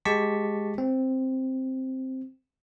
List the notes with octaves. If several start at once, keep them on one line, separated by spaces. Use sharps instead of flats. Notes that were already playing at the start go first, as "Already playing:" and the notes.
G#3 G4 A5 C#6 B6
C4